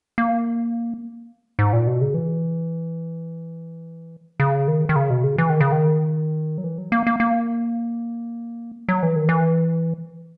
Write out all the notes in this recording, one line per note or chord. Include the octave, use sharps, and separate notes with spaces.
A#3
G#2
A#2
B2
C#3
E3
C#3
D#3
D#3
C#3
B2
C#3
E3
D#3
C#3
D#3
F#3
E3
F#3
A#3
A#3
A#3
F#3
E3
D#3
E3